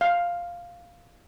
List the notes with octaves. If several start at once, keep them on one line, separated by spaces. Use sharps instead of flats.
F5